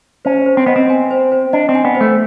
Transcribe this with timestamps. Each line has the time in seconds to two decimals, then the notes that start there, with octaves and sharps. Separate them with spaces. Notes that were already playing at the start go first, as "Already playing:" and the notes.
0.25 C#4 C5
0.46 C5
0.57 C4
0.66 B3 D#5
0.76 C4
0.90 G#5
1.11 C5
1.32 C5
1.53 D4 D#5
1.69 C4
1.75 G#5
1.85 B3
1.95 C5
2.01 A3